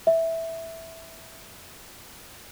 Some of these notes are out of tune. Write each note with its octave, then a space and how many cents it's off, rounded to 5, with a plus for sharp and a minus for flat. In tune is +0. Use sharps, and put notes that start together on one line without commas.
E5 -5